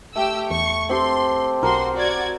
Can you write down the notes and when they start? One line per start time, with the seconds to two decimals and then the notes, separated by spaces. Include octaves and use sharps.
0.16 A3 G4 G5 E6
0.51 E2 C#6
0.89 C4 G4 A4 C6
1.63 B1 F#4 A#4 C6
1.96 F#4 D5 G#6